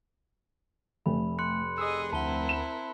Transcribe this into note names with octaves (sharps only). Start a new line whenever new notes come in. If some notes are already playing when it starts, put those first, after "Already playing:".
F1 A3 B5
C6 F#6 C#7
G#4 D#5 D#6 E6
D2 C4 E4 A#4 F#5 A5 G7
E7